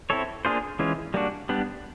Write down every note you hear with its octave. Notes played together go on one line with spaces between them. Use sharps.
C4 E4 A4 C#5
A#3 D4 F4 G#4 C5
E3 G#3 C#4 F4
G3 A#3 D4 F#4
G3 B3 D4